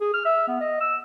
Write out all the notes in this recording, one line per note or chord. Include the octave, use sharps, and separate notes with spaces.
G#4
F6
E5
B3
D#5
E6